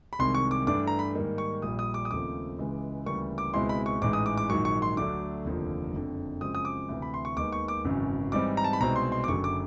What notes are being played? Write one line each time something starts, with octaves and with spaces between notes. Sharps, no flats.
B5
C2 C3 D#3 G#3 C6
C#6
D6
G2 E3 A3 D4 D6
A#5
B5
G#2 D#3 G3 A#3 D#4
C#6
A#1 A#2 G3 D#6
D#6
D6
D#6
D#2 C#3 F3 A3 C4 D6
C#2 C#3 E3 G#3
D2 C#3 E3 G3 A#3 C#6
D6
C#2 B2 G#3 C4 E4 C6
B5
C#6
A1 G#2 E3 G#3 D6
D#6
D6
D6
A#1 G#2 D#3 F#3 C#6
C#6
C6
D2 D3 F#3 A3 D4 D6
F1 D#2 D3 F3
F#1 F2 D3
F#2 C#3 F3 G#3 C4 D#6
D#6
D6
D2 C3 E3
B5
C6
C#6
D#2 D#3 G#3 B3 D#4 D6
C#6
D6
G#1 F#2 C#3 E3
G#2 E3 G3 C4 D#4 D6
A#5
A5
B5
C2 B2 G#3 C4 D#4 A#5
C6
C6
D6
F#1 F#2 D3 F#3 C#6
D6